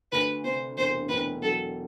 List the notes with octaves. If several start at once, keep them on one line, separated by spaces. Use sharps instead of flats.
D2 B4
C3 C5
E1 C5
E1 B4
F#3 A4